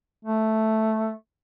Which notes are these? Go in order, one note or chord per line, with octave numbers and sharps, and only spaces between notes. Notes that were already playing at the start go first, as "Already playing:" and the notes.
A3